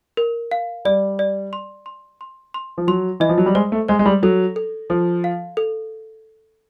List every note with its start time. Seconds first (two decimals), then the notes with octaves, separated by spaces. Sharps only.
0.17 A#4
0.51 F5
0.85 G3 D5
1.19 D5
1.53 C6
1.86 C6
2.21 C6
2.54 C6
2.78 F3
2.87 F#3 C6
3.20 E3 D#5
3.29 F3
3.38 F#3
3.46 G3
3.55 G#3 C5
3.72 A3
3.88 G#3 C5
3.99 G#3
4.06 G3
4.23 F#3 A4
4.56 A4
4.90 F3 A4
5.24 F5
5.57 A4